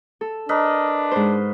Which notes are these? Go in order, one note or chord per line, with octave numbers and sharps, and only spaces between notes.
A4
D4 A#4 B4 D#5
G#2 C5